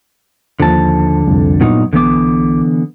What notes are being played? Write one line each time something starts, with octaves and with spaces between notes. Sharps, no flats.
D#2 D3 F3 A5
C2 F2
G2 A#2 F#3 B3 D#4
B1 D3 E3 B3 D6